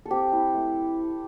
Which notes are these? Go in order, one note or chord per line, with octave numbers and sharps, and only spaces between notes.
A4
C4 G4
E4
A3